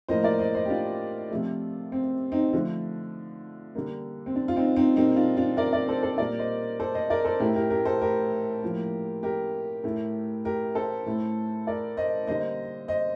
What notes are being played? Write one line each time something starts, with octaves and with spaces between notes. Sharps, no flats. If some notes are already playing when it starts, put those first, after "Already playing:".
A2 F3 A#3 C5 D#5
A#4 D5
C5 D#5
C5 D#5
G4
D4 F4
C3 F3 A3
C4
C4 D#4
D3 F3 A3
D3 G3 A#3
C4
D4
F4
C4 D#4
C4 D#4
A#2 G3 A#3 C4 D#4
D4 F4
D4 F4
A#4 D5
A#4 D5
A4 C5
A4 C5
A#2 G3 A#3 A#4 D5
C5 D#5
A4 C5
C5 D#5
A#4 D5
A4 C5
A2 A3 G4 A#4
G4 A#4
G4 A#4
A4 C5
G4 A#4
A2 F3 A#3
G4 A#4
A2 A3
G4 A#4
A4 C5
A2 A3
A#4 D5
C5 D#5
D3 G3 A#3 C5 D#5
C5 D#5